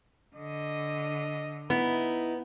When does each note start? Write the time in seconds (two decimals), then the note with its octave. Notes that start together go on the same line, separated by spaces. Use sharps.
0.36 D3 D#5
1.70 B3 D#4 E4